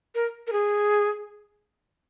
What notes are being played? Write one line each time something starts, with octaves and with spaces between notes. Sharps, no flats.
A#4
A#4
G#4